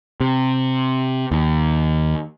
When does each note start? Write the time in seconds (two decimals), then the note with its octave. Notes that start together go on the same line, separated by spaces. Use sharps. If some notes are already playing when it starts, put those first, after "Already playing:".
0.21 C3
1.31 D#2